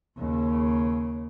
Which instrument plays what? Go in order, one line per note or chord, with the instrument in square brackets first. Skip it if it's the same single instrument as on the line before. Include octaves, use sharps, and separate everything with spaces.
[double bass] D#2 C#3